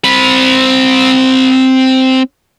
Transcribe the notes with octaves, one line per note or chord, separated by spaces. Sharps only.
C4 B5